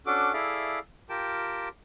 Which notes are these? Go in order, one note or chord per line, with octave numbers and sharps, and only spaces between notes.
C#4 D4 F#4 A4 D6
E4 G#4 A4 D5 E5 F5
F4 G4 A#4 G5 A5